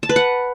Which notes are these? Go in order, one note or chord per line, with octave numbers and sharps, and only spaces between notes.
A5
B4
F#5